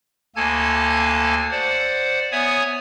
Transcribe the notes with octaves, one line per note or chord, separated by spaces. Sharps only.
D2 A#3 A4 G#5 A5 G#6
C5 D5 F#5
B3 C#5 E5 G#5 D#6 G#6